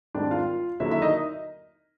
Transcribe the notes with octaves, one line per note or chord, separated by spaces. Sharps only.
G#2 D#3 G3 C4 D4 D5
F4 F5
D#2 D3 F#3 A#3 E4 E5
E4 E5
D#4 D#5